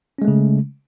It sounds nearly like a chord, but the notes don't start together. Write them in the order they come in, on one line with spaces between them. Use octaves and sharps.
C#4 G#3 A3 C#3